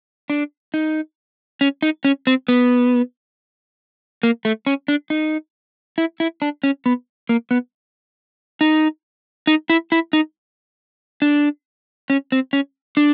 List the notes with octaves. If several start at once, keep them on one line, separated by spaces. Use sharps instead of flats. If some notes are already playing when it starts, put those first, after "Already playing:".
D4
D#4
C#4
D#4
C#4
C4
B3
A#3
A3
C#4
D4
D#4
E4
E4
D4
C#4
B3
A#3
B3
D#4
D#4
E4
E4
D#4
D4
C#4
C4
C#4
D4